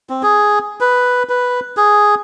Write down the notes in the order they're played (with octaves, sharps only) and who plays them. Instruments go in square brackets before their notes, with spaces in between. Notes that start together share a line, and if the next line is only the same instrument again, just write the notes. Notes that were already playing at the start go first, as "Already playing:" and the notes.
[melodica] C4
G#4
B4
B4
G#4